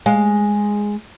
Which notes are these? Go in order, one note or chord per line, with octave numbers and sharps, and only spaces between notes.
G#3 F5